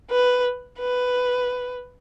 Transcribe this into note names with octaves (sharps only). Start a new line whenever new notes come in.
B4
B4